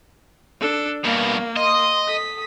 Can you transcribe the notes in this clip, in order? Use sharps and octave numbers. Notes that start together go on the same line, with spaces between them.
D4 A4
G2 B2 A#3
D#5 C6 D#6
A4 D#6 B6